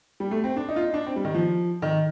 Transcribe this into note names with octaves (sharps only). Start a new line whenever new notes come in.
G3
A3
C4
D4
D#4
F4
D#4
D4
C4
G3
D#3
F3
D#3